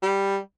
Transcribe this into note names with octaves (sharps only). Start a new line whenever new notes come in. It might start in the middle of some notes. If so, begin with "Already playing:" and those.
G3